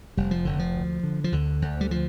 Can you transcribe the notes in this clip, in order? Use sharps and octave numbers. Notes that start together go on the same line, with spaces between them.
F1 G3
F3
F1 D3
F3
D2
D3
F3
D2 D3
D2
G3
F3